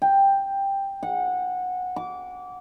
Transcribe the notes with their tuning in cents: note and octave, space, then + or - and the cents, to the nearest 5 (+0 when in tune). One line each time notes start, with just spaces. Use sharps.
G5 +10
F#5 -20
D6 -25